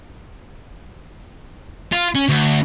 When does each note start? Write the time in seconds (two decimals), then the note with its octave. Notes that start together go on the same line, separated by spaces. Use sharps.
1.93 F4
2.15 C#4
2.29 D2